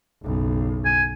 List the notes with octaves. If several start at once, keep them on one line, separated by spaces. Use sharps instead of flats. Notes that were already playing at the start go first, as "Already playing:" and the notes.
F#1 B1
G#5